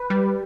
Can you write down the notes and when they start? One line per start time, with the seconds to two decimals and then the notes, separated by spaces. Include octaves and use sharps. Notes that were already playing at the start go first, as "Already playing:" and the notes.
Already playing: B4
0.10 G3